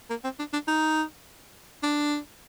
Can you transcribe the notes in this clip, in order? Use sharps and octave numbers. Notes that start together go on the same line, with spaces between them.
A#3
C4
D4
D4
D#4
D4